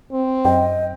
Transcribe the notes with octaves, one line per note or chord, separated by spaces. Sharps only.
C4
F#2 D#5 G5